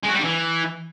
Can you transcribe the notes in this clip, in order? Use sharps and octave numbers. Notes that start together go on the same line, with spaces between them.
G#3
F#4
G3
D4
E3